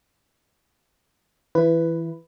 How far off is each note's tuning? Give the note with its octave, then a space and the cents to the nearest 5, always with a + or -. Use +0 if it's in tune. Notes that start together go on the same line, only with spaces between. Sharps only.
E3 -20 E4 +20 B4 +5